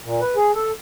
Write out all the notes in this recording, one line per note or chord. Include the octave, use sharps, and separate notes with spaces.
A#2
B4
G#4
A4